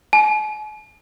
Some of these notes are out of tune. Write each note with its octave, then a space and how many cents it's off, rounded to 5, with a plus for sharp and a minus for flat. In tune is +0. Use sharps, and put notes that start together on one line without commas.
G#5 +45